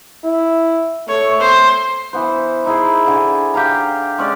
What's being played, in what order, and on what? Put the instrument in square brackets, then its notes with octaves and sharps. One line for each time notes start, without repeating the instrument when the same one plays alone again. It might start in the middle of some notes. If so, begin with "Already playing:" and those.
[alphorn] E4
[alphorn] A3 [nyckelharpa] C#5
[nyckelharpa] C5
[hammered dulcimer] E3 B3 C5
D#4 E4 G#4 C6
D3 G#5
G4 F5 A#5
G#3 C#4 D5